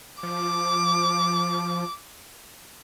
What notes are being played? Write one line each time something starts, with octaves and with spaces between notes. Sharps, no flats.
F3 D6